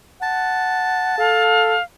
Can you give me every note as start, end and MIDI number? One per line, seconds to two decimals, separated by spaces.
0.22 1.14 78
0.22 1.43 81
1.18 1.78 69
1.18 1.83 77